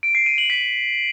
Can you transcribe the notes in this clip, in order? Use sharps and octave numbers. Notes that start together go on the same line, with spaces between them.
D7
C7
D#7
F#7
B6